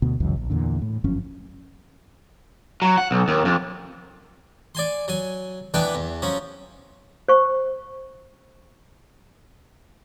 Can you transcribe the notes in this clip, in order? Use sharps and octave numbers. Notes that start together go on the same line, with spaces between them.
D2 B2 B3
G1 C#2 F#2 E3
A#1
E2 A#2 D3
A2
G1 F#2 F3 C#4
F#3
F#5
B1
D#2
F2
D5 G#5 C6
F#3 G#5
E3 B3 D4 B4 G5
E2
F3 F#3 C#4
C5 C#6